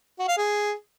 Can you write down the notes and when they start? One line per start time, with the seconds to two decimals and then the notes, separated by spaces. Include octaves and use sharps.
0.19 F#4
0.28 F5
0.37 G#4